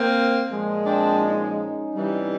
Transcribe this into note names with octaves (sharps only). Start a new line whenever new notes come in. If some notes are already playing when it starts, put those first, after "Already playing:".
Already playing: A#3 C4
A#2 F3 G#3
C4 D4
C#4 D#4
C3 E3 G3